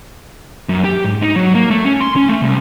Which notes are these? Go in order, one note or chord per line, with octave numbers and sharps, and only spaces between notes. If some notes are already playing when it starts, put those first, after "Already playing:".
F#2
G4
G#2
D#4
F#3
A#3
A3
C#4
C6
C#4
A3
C2